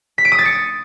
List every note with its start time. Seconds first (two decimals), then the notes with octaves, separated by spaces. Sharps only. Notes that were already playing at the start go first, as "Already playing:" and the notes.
0.18 B6
0.25 D7
0.32 D#6
0.39 A6
0.45 C#7